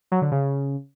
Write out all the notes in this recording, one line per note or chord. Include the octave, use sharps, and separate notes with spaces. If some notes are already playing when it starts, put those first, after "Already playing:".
F#3
D3
C#3